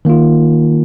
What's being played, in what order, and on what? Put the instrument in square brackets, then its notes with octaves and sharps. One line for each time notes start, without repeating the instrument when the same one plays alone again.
[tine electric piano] D#3 A#3 F4